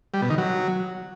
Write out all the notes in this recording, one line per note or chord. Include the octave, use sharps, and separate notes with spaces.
G3
B2
D#3
F#3